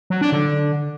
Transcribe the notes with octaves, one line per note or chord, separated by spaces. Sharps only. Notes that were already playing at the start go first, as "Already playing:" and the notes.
F#3
D4
D3